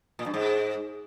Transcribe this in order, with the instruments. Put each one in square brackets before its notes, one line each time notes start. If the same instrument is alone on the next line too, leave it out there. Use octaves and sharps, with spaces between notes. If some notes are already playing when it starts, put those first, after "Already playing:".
[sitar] A#2
G2
G#2